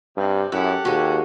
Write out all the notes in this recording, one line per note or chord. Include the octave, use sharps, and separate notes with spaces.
G2 C3
F#2 E4 G4 A4 F#5
D#2 G#3 F#4